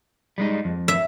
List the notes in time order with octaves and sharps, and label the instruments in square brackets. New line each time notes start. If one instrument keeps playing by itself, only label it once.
[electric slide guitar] G3 G#3 D#4
F2
[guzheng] E5